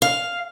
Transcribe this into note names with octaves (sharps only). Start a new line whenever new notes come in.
F5